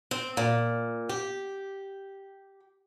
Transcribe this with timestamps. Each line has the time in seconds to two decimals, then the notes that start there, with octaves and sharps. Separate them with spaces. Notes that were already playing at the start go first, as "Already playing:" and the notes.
0.11 C4
0.37 A#2
1.09 G4